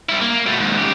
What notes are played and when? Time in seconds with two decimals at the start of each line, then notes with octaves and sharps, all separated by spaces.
0.09 G3 E4
0.21 A#3
0.46 B2 A3
0.60 D#2 G#2
0.77 C#3 G4